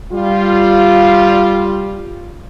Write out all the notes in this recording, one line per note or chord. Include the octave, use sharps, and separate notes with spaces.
G3 F4